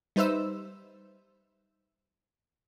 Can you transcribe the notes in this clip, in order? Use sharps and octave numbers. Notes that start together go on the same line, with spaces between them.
G3 D#4 B4 C5 E5 E6